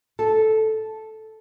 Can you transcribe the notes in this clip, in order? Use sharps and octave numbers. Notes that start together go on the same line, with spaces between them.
A4